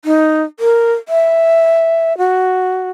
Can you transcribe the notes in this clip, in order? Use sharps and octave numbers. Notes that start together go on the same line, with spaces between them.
D#4
A#4
E5
F#4